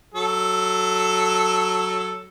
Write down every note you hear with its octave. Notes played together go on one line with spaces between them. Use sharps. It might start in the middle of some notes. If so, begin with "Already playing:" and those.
F#3 A4